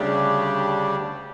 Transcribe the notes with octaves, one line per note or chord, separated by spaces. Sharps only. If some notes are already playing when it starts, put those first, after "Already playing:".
Already playing: D2 C#3 G3 D4 G4